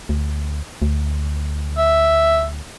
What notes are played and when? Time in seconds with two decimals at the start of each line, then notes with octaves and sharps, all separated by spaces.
0.09 D2
0.82 D2
1.77 E5